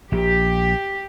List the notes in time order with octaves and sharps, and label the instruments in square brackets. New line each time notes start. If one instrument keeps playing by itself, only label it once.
[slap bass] A#1 [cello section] G4